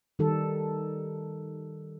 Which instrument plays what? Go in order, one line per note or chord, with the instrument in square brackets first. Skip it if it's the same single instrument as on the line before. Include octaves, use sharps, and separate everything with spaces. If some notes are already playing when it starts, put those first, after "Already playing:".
[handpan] D#3 G3 A4